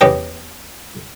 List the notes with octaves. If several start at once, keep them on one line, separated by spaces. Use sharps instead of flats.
E2 B3 C#4 G4 D#5 G5